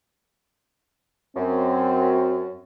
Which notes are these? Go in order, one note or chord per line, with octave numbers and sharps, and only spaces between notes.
F#2 C4